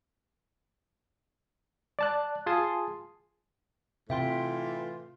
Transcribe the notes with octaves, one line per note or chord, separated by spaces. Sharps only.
D5 A5 F#6
F4 G#4 G#5 A5 C6 D#6
A2 C3 E3 F4 E5 G5 C6